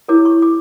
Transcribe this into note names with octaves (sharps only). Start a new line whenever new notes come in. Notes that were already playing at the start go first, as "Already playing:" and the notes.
E4 G4 A#4 C#5 D6
C#6
D6